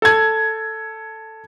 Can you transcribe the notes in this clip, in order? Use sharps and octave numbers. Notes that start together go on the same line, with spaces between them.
A4 G#6